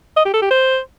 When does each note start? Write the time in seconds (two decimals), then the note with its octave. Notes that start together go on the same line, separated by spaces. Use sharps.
0.17 D#5
0.25 G4
0.34 A4
0.42 G4
0.50 C5